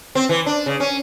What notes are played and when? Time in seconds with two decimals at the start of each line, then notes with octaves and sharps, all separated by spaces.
0.15 C4
0.29 E3
0.46 D4
0.66 C#3
0.80 C#4